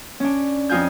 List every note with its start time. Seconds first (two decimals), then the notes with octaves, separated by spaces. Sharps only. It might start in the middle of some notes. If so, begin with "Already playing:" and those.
0.20 C#4 D4
0.69 F2 D#4 F4 G#5 G6